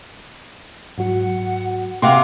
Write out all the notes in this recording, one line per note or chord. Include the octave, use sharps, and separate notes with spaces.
G#2 F#3 F#4 F#5
C3 A#3 F5 F#5 C6 D6